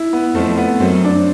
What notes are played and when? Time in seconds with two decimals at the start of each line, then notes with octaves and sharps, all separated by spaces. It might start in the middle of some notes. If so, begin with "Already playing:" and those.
Already playing: E4
0.13 B3
0.35 F2 F3 A3
0.57 B3
0.80 F#2 F#3 C4
1.04 D4